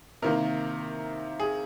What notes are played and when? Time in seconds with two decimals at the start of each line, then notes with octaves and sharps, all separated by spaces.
0.22 C3 D#3 A#3 A#4
1.40 G#4